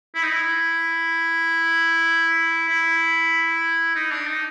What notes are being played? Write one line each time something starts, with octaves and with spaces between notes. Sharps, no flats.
E4
D#4
E4
E4
D#4
D4
D#4